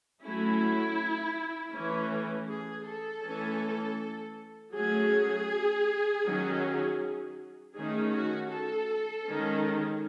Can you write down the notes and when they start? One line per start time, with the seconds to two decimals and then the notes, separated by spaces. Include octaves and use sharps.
0.23 F#3 A3 C#4 E4
1.74 E3 A3 C#4
2.49 G#4
2.87 A4
3.24 E3 A3 C#4
4.75 F#3 A3 C#4 G#4
6.25 D#3 F#3 C#4
7.75 D#3 A3 C#4 G#4
8.13 F#4
8.50 A4
9.26 D#3 G#3 C#4